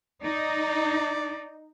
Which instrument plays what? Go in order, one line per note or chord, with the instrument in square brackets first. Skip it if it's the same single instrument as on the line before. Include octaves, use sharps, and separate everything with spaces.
[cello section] D#4 [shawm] D5